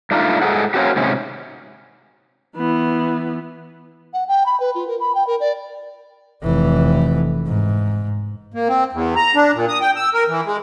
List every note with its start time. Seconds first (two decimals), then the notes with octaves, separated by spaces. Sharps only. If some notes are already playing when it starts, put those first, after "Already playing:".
0.11 G2 A3 D4 D#4 F4
0.42 G#2 G#4 A4 F#5
0.74 A#3 C4 C#4 D#4 F#4 G4
0.96 G#2 C3 C#4
2.56 E3 B3
4.13 F#5
4.28 G5
4.46 B5
4.60 B4
4.75 F4
4.88 A#4
5.00 B5
5.15 G5
5.27 A#4
5.40 D5
6.43 F1 E3
7.47 G#2
8.54 A#3
8.69 C4
8.93 E2
9.16 A#5
9.35 D4
9.54 A#2
9.69 D#6
9.81 G5
9.96 E6
10.14 A#4
10.28 E3
10.46 G#3